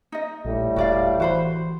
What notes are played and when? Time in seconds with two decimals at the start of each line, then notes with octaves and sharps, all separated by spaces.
0.12 D#4 D#5
0.45 A#1 A2 G3 A3
0.76 D#1 F#4 D5 F5
1.20 E3 F#4 C5 B5